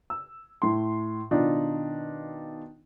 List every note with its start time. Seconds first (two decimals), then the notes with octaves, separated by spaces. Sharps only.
0.10 E6
0.62 A2 C6
1.31 B2 D#3 D4 D#4 F4